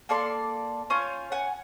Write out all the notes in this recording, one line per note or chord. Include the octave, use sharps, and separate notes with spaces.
A#3 A4 D5 C6
C#4 F4 C#5 G6
F#5 G#5